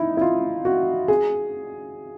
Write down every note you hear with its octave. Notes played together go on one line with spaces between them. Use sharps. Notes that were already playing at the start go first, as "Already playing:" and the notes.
Already playing: D#4 E4
E4
F4
F#4
G#4